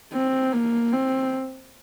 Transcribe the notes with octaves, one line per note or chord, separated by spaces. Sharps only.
C4
A#3
C4